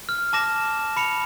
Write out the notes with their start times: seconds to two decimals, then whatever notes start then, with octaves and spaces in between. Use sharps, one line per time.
0.09 F6
0.33 A5 D6 A#6 E7
0.97 B5 C#7 F7